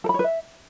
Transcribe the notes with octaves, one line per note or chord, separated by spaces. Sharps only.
A4
B5
C#5
B4
E5